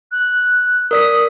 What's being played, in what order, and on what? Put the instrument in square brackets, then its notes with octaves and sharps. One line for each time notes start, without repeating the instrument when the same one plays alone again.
[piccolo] F#6
[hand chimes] A#4 D5 B6 [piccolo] D#6